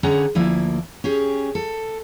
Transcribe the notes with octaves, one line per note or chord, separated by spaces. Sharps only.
D3 C#4 G#4 F#5 A#5
D2 F3 A#3 E4
C#4 G4 G#4
A4